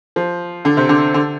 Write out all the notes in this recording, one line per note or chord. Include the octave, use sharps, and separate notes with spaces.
F3
D3
C3
D3
D3